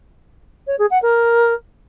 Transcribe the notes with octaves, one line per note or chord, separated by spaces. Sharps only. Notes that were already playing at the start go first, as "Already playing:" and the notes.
C#5
G#4
F#5
A#4